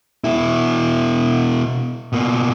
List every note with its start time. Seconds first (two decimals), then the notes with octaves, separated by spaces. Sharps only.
0.24 B2 E4
2.13 B2 A#3